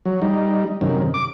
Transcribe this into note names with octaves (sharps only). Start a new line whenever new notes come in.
F#3
G3 D#4
F#2 C3 D#3
D6